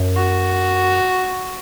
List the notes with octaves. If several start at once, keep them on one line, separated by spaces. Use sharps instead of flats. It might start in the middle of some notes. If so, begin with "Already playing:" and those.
Already playing: F#2
F#4